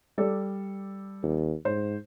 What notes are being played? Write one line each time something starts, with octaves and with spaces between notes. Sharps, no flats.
G3 A4 D5
D#2
G#2 C5